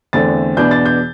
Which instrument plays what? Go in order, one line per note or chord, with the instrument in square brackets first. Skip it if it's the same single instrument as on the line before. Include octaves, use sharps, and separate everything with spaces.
[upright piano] E2 D3 A3 C4 A6
E2 B2 B3 D4 G6
A6
G6